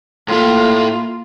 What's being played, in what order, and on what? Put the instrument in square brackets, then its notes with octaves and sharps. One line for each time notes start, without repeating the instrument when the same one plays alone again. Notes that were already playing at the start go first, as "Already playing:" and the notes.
[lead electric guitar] A2 A3 [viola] A#3 F4